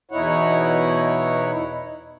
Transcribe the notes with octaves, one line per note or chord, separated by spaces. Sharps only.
E2 B2 D#4 E4 C#5 F#5